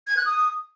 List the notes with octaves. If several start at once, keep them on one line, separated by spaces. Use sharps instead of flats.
G#6
F#6
D#6